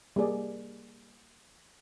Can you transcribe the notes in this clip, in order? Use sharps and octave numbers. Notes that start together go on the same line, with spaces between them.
G3 A#3 G#4 D5